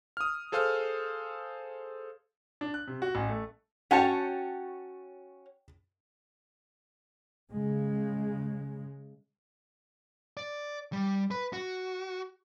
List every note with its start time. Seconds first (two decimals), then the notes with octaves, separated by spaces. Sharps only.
0.17 D#6 F6
0.52 G#4 A4 C5 F5 D#6 F6
2.61 D4
2.74 F#6
2.87 C3
3.02 F#4
3.15 A1
3.29 A3
3.91 C#4 F#4 C#5 F#5 G5 A5
7.51 C#3 G#3
10.37 D5
10.93 G3
11.31 B4
11.53 F#4